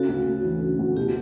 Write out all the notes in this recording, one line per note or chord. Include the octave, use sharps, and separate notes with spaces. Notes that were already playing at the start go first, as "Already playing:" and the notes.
Already playing: C#3 F#4 A4
D2
D2
E3
C#3
D2
B2 E4 G4